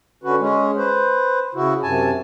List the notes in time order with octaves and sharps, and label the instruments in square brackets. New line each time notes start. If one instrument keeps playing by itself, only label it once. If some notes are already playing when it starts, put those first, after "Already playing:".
[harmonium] D3 C#4 F#4 B4
G#3 C#4
B4 C5
C#3 E4 F#4
F#2 C3 G#5 A5